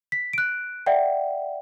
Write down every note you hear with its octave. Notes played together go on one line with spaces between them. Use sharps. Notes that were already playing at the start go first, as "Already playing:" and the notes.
B6
F#6 D7
D5 E5 F#5 G5